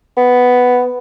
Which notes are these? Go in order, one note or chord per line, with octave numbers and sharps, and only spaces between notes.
B3